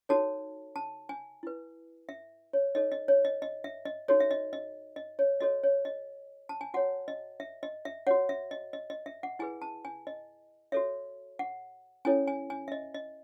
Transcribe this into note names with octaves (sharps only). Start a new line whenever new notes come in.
D#4 F#4 A4 C#5 A5
A5
G#5
E4 B4
E5
C#5
D#4 A4 C#5 D#5
D#5
C#5
D#5
D#5
E5
D#5
D#4 F#4 A4 C#5
E5
D#5
D#5
D#5
C#5
F#4 A4 C#5 D#5
C#5
D#5
A5
G#5
F#4 C#5 F#5
D#5
E5
D#5
E5
F#4 C#5 F#5
E5
D#5
D#5
D#5
E5
F#5
E4 G#4 B4 G#5
A5
G#5
D#5
F#4 A4 C#5 E5
F#5
C#4 E4 A4 C#5 G#5
G#5
G#5
E5
D#5
D#5